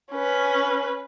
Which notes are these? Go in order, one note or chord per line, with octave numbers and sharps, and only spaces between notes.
C#4 B4